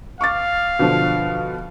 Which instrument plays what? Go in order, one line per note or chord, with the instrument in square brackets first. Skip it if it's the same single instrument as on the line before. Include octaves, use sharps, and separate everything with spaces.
[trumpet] F5 [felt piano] C#6 D6 A6
[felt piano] B2 D3 F3